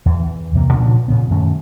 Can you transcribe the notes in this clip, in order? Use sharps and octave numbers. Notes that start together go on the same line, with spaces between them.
E2 E3
C#2 C3 A#3
A#2 C#3 F3 D4
A#2 C#3 B3
F#2 D#3 A3 C#4